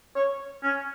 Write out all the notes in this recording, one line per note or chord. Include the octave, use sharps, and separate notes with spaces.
C#5
C#4